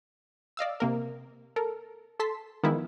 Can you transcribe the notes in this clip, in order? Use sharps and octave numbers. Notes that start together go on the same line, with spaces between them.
D5 D#5 F5 E6
C3 A#3 A#4
A4 A#4
A4 A5 C6 B6
D#3 F3 G#3 B3 E4